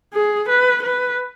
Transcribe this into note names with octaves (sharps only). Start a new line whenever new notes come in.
G#4
B4
B4